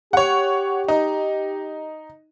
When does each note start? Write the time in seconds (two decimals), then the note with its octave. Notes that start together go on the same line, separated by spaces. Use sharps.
0.13 G4 C#5 F#5
0.88 D#4